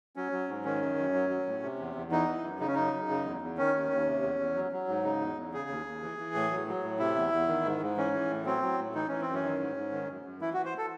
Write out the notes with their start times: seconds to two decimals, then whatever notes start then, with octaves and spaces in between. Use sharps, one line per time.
0.16 F#3 C#4
0.32 F#3
0.49 G#2
0.65 D#3 C#4
0.82 F#2
0.98 F#2
1.14 F#3
1.30 F#3
1.46 A2
1.63 C3
1.79 E2
1.95 E2
2.11 E3 D#4
2.28 E3
2.44 F#2
2.60 C#3 D#4
2.68 C#4
2.74 F#2 D#4
2.93 F#2
3.09 C#3
3.25 E2
3.42 E2
3.58 D#3 C#4
3.74 D#2
3.91 D#2
4.07 C3
4.22 E2
4.39 E2
4.55 F#3
4.72 F#3
4.88 G#2
5.04 C#3 D#4
5.21 E2
5.37 E2
5.53 C#3 G#4
5.69 D#2
5.86 D#2
6.02 E3
6.18 E3
6.34 A2
6.51 F#3
6.67 F#3
6.84 A2
6.99 C3 E4
7.15 E2
7.32 E2
7.48 D#3
7.65 G#2
7.81 G#2
7.97 E3 C#4
8.13 E3
8.30 A2
8.46 F#3 C4
8.62 F#3
8.78 A2
8.94 E3 D#4
9.08 E3 C#4
9.21 C4
9.28 F#2
9.34 C#4
9.43 D#3
9.59 G#2
9.76 G#2
9.92 D#3
10.09 F#2
10.25 F#2
10.41 E3 E4
10.53 F#4
10.57 E3
10.65 C5
10.78 A4